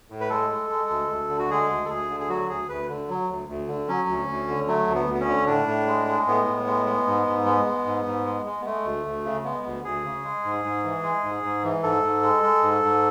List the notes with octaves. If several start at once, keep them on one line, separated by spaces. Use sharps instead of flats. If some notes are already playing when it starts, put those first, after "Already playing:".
A2
B4
G#3 A4
G#3
G#3
D2
D2
D3
F#4
G#3 G#4
D2
A4
D2 G#4
D3
G#4
F#3 F#4
D2 G#4
D2 B4
D3
F#3
D2
D2
D3
F#3 C#4
D2
D2
D3
F#3 A3
D2
B3
D2
B3
C#4
D3
A2 D4
A2
G#3
G#3
A2 B3
A2
G#3
G#3
G#2
G#2
G#3
G#3
G#2
G#2
G#3
G#3
B3
G#3 A3
D2
D2
C#3
G#3 B3
D2
D2 G#4
C#3
G#3
G#2
G#2
E3
G#3
G#2
G#2
E3
G#2 A4
G#2
G#3
G#3
G#2
G#2